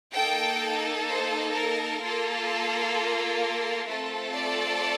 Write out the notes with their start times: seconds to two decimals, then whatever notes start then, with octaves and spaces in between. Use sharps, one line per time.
0.13 A#3 D#4 A4 G5
1.07 C5
1.53 A#4
2.00 A#3 F4 A4
3.40 A#4
3.87 A3 C4 F4 A4
4.34 D5